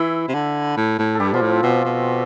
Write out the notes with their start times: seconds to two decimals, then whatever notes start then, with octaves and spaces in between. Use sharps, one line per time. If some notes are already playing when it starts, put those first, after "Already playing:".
Already playing: E3 E4
0.28 C3
0.34 D3
0.77 A2
0.98 A2
1.15 G2 G3 G4 A4
1.33 B2 F3 F4
1.42 A2
1.49 C4
1.63 B2 C4
1.85 B2